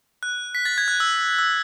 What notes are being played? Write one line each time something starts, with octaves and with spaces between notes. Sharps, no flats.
F#6
B6
A6
G#6
F#6
E6
E6